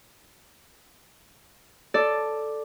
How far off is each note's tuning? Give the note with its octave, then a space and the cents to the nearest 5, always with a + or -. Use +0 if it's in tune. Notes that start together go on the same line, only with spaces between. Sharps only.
A4 +0 D5 +5